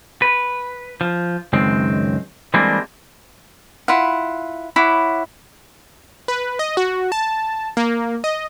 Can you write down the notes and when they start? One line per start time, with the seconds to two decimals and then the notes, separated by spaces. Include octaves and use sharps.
0.22 B4
1.01 F3
1.53 C#2 F#2 D#3 G#3 C4
2.54 E3 G3 G#3 A#3 C4 D4
3.88 E4 F4 F#5
4.76 E4 C#5 F#5 D6
6.28 B4
6.59 D#5
6.77 F#4
7.12 A5
7.77 A#3
8.24 D#5